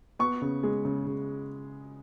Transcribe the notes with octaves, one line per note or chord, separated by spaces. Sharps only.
B3 C#6
C#3
G#3
C#3
C#3